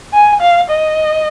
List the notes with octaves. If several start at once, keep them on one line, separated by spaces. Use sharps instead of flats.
G#5
F5
D#5